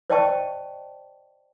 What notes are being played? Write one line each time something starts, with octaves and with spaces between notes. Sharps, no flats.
C5 D5 D#5 G5 A5 C#6